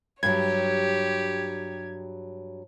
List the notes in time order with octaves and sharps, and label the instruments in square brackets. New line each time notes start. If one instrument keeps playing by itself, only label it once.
[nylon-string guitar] G2 F#3 [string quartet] G4 C#5 [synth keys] G#6